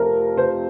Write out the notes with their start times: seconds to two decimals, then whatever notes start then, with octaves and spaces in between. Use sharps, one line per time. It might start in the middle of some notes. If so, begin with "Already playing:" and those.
Already playing: F2 C3 F3 A3 A#4
0.37 C5